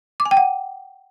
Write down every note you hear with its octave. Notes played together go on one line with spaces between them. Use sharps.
D6
G#5
G5
F#5